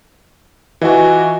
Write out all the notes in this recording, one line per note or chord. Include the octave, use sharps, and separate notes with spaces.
E3 F4 F#4 D#5 G#5